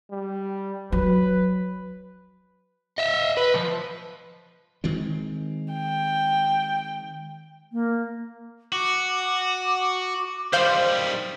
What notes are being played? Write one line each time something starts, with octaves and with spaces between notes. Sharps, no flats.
G3
F#3 B4
D#5 E5
B4
F3
D#3 G#3 C4
G5
A#3
F#4 D6
D#3 G3 C5 F5